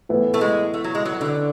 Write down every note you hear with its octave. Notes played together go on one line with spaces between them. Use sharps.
A2 E3 B3 E4
A3
G#3
A3
F#3
G#3
F#3
D3